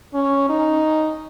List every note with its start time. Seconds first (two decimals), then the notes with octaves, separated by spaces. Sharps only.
0.14 C#4
0.49 D#4